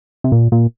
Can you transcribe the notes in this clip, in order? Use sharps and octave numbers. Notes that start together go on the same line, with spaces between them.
C3
A#2
A#2